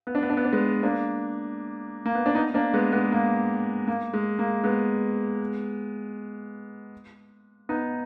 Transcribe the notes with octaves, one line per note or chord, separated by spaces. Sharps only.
B3
D4
B3
D4
B3
D4
G#3 B3
A#3 D4
A#3
B3
D4
B3 D#4
A#3 D4
G#3 B3
G#3 B3
A#3
A#3
G#3
A#3
G#3 B3
B3 D#4